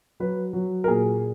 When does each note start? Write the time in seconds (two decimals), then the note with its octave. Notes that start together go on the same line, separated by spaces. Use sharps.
0.20 F#3 B4
0.53 F#3
0.84 A#4
0.88 A#2 G#4